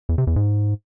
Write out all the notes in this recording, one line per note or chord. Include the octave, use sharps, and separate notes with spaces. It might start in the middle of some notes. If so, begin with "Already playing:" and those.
E2
C3
E2
G#2